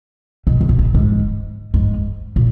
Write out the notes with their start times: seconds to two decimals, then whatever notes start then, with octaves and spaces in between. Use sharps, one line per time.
0.47 B2
0.61 C3
0.69 B2
0.79 A#2
0.94 G#2
1.74 G#2
2.36 A#2